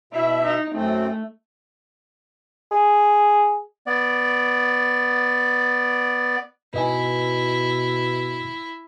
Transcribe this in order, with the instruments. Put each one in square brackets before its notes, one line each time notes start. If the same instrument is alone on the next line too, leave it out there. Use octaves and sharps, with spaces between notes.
[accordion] B2 E5 [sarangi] E4
[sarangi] D#4
[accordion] F#2 C4 [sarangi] A3
[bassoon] G#4
[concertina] B3 D5
[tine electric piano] G#2 [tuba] B2 [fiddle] E4 [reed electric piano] B4 D#5 G#5